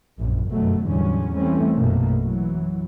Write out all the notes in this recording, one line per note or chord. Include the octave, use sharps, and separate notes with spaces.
A#1 F#2 A#2
G1 F#2 B2 F#3 A3
E2 A2 D3 F#3 G3 C#4
E3 G3 A3 C4 C#4
A#1 F#2 B2 A3 A#3
F#2 E3 F#3